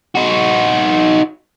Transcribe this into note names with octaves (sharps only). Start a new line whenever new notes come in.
D#4 F#4